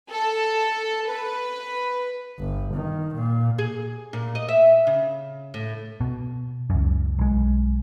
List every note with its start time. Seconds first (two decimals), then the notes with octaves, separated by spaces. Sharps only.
0.10 A4
1.10 B4
2.40 G1
2.74 D#3
3.14 A#2
3.58 G#4
4.13 A#2
4.35 D#5
4.49 E5
4.87 C#3
5.54 A2
6.01 B2
6.70 C#2 F#2
7.19 B1 G#3